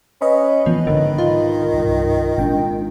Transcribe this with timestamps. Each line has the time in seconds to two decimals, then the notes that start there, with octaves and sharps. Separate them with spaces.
0.21 C#4 B4 D#5 B5
0.66 E3 F3 B3
0.87 B1 G#2 D3 D#3
1.18 F4
1.74 C2 G2
2.38 G#1 A#2 G#3 D4 G5